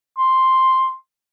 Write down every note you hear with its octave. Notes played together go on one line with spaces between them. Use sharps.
C6